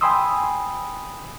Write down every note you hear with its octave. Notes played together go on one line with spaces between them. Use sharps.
G5 G#5 B5 C6 D#6 E6